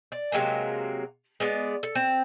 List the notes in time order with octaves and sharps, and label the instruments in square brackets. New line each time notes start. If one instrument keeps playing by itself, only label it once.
[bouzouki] D5
C3 F#3 G#3 A#3
G#3 B3 D5
A4
C4